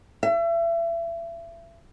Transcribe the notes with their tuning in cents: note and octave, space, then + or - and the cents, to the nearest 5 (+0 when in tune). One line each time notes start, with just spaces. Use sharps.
E5 +35